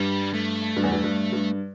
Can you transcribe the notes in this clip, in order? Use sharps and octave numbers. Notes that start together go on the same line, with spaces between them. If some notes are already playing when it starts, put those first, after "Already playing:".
Already playing: G2 G3
A3
G2
E2
G2
G2
G2